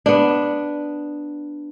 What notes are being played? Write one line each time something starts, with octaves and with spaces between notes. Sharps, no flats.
B3 D4